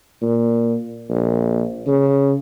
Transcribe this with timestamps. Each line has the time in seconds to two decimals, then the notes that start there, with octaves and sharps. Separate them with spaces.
0.22 A#2
1.10 A#1
1.87 C#3